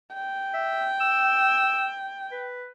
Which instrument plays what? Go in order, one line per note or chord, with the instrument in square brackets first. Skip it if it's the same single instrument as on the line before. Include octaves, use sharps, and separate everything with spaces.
[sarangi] G5
[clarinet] E5
E6
B4